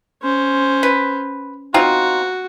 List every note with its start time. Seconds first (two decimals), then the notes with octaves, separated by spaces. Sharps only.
0.22 C#4 C5
0.83 B4
1.74 C4 D#4 F4 F#4